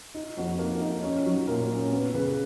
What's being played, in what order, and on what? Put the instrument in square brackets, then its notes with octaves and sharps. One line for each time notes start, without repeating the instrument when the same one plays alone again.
[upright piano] D#4
F2 F#4
A#3
D#4
C#4
F#3
A#2 A#4
C#4
B3
C#3 B4